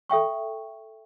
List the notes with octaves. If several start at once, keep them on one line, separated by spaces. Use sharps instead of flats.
A4 E5 G5 C#6